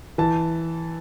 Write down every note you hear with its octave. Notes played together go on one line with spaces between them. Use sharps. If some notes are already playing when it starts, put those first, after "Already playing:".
E3 A5